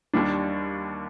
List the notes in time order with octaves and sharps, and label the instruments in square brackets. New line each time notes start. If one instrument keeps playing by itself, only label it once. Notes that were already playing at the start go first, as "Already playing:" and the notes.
[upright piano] D#2 D#3 G3 D4